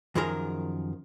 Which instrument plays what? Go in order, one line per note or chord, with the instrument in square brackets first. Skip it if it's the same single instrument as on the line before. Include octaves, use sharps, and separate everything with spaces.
[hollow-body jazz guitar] F#2 D#3 F3 G#4 A#4 A#5